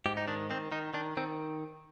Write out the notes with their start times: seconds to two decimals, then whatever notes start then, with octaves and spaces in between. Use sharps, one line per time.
0.06 G#2 G4
0.17 D#4
0.28 D#3 D4
0.50 D#3 C4
0.72 D#3 D#4
0.94 D#3 D4
1.17 D#3 C4